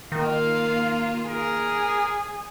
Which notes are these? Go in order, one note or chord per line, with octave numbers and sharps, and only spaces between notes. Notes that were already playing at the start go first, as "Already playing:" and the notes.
D#3 A#3 F4 F5
G#4 A#4